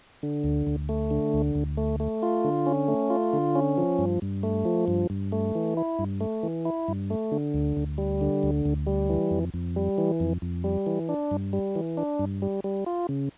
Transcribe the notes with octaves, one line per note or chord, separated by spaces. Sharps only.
D3
D2
D2
A3
D3
D2
D2
A3
A3
F4
D3
C#4
A3
F4
D3
C#4
F3
G2
G2
A3
F3
G2
G2
A3
E3
E4
G2
A3
E3
E4
G2
A3
D3
D2
D2
G3
D3
D2
D2
G3
E3
F2
F2
G3
E3
F2
F2
G3
E3
D4
G2
G3
E3
D4
G2
G3
G3
F4
C#3